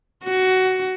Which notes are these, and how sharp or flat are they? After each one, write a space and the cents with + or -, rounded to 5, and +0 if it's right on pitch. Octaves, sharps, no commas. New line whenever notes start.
F#4 +15